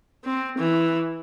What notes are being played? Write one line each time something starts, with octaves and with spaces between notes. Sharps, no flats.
C4
E3